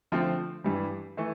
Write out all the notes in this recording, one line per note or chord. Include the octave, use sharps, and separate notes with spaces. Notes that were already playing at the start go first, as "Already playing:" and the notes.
D3 F3 A3 C4 F4
G2 E3 G3
E3 A3